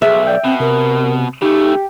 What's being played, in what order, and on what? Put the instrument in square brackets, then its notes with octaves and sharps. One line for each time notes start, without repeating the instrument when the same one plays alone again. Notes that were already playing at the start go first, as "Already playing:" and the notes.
[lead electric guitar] B1 [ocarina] G#4 [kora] E5
[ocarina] D5 [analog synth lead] G5
[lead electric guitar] B2 [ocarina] C4
[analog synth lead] C3 [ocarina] A#4
[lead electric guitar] C#3 A3 [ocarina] D#4 [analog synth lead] G4